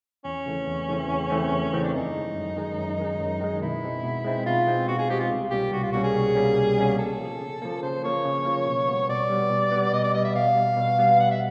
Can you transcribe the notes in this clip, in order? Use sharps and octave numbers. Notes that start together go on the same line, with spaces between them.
E2 C#4
C#3 E3 A3 C4
E2
C#3 E3 A3 C4
E2
C#3 E3 A3 C4
E2
C#3 E3 A3 C4
D4
F#2 D#4
D#3 G#3
F#2
D#3 G#3
F#2
D#3 G#3
F#2
D#3 G#3
B2 E4
G#3 C4 D#4
B2
G#3 C4 D#4
B2 F4
G#3 C4 D#4
B2 F#4
G#4
G#3 C4 D#4 G4
F4
C2
B2 G3 A#3 C#4 G4
C2 F#4
F4
B2 G3 A#3 C#4 F#4
G#4
C2
B2 G3 A#3 C#4
C2
B2 G3 A#3 C#4
C#3 A4
F3 A#3
C#3
F3 A#3
C#3 C5
F3 A#3 C#5
C#3
F3 A#3
B2
G3 B3
B2 D5
G3 B3
B2
G3 B3
B2 D#5
D5
G3 B3 D#5
E5
B2 F5
G3 B3
B2
G3 B3
B2 F#5
E5